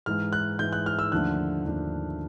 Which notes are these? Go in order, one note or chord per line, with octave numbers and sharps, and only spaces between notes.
G#2 E3 G#3 F6
F#6
G#2 E3 G#3 G6
F#6
F6
E6
D#2 D3 F3 A3 D4 F#6
D#2 D3 F3 A3 D4